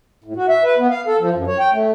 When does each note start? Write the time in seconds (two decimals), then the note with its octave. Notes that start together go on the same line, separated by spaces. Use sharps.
0.24 A2
0.36 F#4
0.49 E5
0.64 B4
0.78 B3
0.90 F5
1.07 A4
1.20 F3
1.33 F#2
1.47 C#5
1.59 G5
1.72 A3